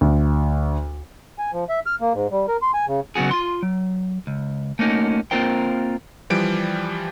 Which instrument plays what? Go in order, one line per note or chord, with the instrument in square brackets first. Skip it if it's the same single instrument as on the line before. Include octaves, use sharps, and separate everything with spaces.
[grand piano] D2
[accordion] G#5
F3
E5
F6
A#3
G#2
G3
A#4
C6
G#5
C#3
[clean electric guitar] C#3 F#3 B3 F#4 G#4
F4 C6
F#3
C#2
A3 A#3 C#4 D#4 F#4
A#3 C4 F4 A#4 C5 G5
[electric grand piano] E3 F3 G3 D7